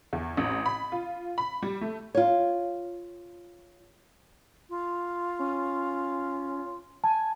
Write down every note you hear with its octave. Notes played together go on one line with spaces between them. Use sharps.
E2
A1
B5
F4
B5
G3
A3
F4 C#5
F4
C#4
G#5 A5